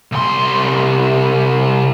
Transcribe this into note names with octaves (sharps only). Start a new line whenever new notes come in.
C2 C6